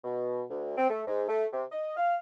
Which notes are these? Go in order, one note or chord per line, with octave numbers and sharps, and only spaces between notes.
B2
D2
C4
A3
G#2
A3
C3
D#5
F5